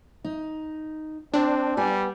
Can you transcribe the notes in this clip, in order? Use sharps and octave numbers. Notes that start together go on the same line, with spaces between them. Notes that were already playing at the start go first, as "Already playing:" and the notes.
D#4
C4 D4
G3 B3 G#5